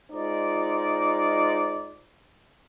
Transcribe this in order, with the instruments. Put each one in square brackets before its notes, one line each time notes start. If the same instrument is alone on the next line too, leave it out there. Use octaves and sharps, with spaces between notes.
[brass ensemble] G#3 D#4 F4 C5 D5